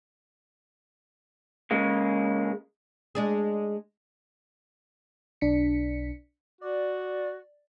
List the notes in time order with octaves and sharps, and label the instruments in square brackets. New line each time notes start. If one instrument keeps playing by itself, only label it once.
[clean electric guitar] C#3 G#3 A#3
[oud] G#3 D4 G#4
[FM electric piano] B1 D4 B6 C#7
[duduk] F#4 [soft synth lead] D5